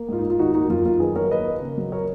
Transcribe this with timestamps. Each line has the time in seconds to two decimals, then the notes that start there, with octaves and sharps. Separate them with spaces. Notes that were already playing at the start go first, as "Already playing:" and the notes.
Already playing: A#3
0.09 G#2 F4
0.18 D#4
0.24 G#2
0.30 F4
0.39 D#3 D#4 F#4
0.54 A#3 D#4 F#4
0.70 F#2 F4
0.86 F#2 F4
1.00 D#3 G#4 B4
1.16 F#3 A#4 C#5
1.31 D#2 B4 D#5
1.46 A#3
1.61 C#3
1.78 F#3
1.92 A#4 C#5